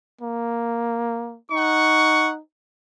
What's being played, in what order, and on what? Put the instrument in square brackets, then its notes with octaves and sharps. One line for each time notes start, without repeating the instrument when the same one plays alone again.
[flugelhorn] A#3
[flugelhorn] D#4 [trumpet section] F#5 C#6